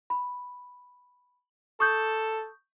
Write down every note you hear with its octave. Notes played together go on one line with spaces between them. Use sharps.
B5
A4 C#6 D#6 G6